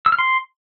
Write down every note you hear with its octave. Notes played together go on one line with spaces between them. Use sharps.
E6
F6
C6